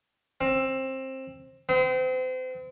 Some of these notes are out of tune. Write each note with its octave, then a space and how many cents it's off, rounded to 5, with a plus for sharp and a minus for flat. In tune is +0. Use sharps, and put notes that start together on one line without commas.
C4 +20
C4 -35